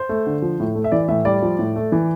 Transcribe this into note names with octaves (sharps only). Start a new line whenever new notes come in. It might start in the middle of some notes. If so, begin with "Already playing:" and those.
Already playing: C5
A3
D3
F3
A2
A3
E5
E3 D5
A2 E5
G3 D5
F3
A2
A3
E3